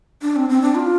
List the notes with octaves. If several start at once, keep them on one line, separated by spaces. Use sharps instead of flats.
D4
C4
C4
D4
F4